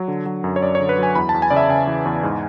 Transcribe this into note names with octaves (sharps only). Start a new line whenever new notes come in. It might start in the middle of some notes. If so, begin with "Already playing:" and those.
Already playing: F#3
D3
F#3
F#2
C#5
F#2 D5
C#5
D3
B4
F#3 G#5
E2 B5
A5
E2
G#5
C#3 D5
E5
C#3 G#5
E3
E2
G#2